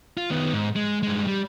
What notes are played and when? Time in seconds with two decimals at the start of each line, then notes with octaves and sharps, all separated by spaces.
0.17 F4
0.30 D#3 B3
0.54 G#2
0.76 G#3
1.03 G2 G#3
1.27 G3